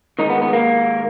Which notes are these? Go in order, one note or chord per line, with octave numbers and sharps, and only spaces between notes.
G#2 D#3 D#4
B3
B3
A#3